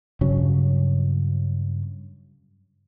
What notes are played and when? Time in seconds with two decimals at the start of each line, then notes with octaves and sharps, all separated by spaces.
0.21 G2 C#3 F#3 C#4